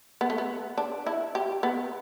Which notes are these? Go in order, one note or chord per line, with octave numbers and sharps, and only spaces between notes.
B3
A3
B3
D4
E4
G4
B3